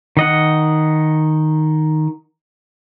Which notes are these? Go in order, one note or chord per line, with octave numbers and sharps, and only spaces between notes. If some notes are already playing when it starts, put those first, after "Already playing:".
D#3 D#5 F#5